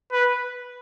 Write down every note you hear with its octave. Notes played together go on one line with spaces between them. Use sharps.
B4